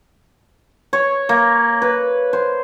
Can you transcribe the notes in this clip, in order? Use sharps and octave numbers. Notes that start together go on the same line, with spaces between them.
C#5
A#3
B4
C5